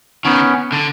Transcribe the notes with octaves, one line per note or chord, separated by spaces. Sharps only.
D#3 B3 C#4
D3